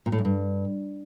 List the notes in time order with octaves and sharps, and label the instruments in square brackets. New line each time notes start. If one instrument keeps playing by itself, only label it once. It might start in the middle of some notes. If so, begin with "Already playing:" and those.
[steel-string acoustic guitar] A#2
A2
F#2
G2